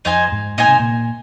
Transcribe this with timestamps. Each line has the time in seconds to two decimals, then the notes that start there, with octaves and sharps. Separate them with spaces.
0.05 F2 D#4 C5 G#5
0.32 G#2
0.57 A#2 D#4 C5 G#5
0.68 C3
0.79 A#2